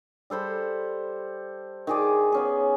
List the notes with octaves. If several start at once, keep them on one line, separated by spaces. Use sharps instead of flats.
G3 A4 C5 B5
D#3 G#4 D5
B3 C#4 G#4